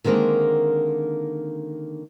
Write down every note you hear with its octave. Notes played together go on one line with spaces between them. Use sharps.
D3 D#3 G#3 A#3 C4 D4